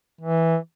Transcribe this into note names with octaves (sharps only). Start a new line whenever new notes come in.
E3